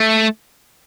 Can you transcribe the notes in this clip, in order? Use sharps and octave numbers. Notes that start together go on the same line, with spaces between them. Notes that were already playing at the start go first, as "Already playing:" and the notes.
Already playing: A3